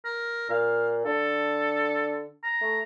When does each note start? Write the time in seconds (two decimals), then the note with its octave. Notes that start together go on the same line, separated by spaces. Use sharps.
0.05 A#4
0.49 A#2 F5
1.05 D3 A4
2.43 A#5
2.61 A3